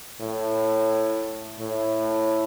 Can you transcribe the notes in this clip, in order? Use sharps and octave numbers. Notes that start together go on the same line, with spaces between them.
A2
A2